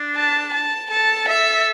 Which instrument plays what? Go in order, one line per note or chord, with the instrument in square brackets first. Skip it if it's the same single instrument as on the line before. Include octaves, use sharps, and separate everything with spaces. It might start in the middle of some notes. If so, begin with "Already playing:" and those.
Already playing: [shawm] D4
[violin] A5
A5
[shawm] A4 [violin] A5
[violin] E5